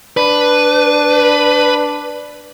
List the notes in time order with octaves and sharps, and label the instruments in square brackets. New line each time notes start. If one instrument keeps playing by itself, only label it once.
[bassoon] D4 [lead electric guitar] B4